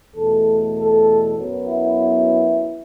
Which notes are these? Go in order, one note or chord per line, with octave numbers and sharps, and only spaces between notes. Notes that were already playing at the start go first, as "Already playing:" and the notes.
E2 B2 A3 A4
A4
F#2 F#3 B3
E4